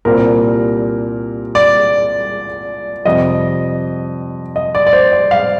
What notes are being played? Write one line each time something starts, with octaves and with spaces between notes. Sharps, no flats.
C2 A#2 G3 C4 A#4
D5
F2 C3 G3 D#5
D#5
D5
D5
C5
D5
F5